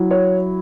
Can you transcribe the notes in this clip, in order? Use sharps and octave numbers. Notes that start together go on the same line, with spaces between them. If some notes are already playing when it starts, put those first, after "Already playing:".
Already playing: F#3 E4
C#5